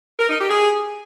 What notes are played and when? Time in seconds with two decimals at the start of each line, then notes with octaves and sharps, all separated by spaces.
0.19 A#4
0.30 D#4
0.40 G4
0.50 G#4